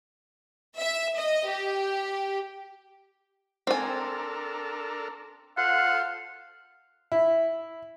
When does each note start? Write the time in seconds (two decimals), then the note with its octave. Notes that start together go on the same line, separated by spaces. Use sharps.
0.79 E5
1.18 D#5
1.49 G4
3.67 C4 D4 A4 A#4 G#5
5.57 F4 A4 C5 F5 F#5
7.12 E4